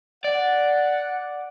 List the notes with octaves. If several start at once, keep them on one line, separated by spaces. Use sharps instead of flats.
D5 F#5